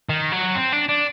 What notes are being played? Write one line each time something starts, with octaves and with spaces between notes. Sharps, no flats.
D#3
F#3
C4
D4
D4